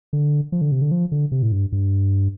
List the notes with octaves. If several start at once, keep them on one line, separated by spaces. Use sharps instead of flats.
D3
F3
D3
C3
D3
F3
D3
C3
A2
G2
G2